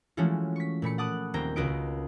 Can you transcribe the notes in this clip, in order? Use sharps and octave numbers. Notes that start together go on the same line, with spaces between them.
E3 F3 G#3 A3 C#4 F#4
C#6 B6
A#2 A3 B5 C#7
F#5 A5 D6 D#6 F#6
D#1 D#3 A#3 C4 G5 A#5
C#2 F#4 A#4 B4 D#5 D7